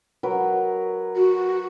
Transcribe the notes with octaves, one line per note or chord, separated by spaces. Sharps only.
F#3 A#4 B4
F#4